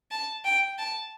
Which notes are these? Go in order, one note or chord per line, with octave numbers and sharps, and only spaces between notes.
A5
G5
A5